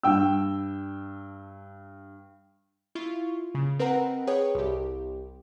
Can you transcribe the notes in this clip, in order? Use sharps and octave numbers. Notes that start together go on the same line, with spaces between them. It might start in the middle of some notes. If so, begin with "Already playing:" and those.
G2 G5 E6
E4 F4 C#6
C#3
C4 A#4 B4 D#5 F#5 A#5
G#4 B4 C#5 G5 D#6
C2 G4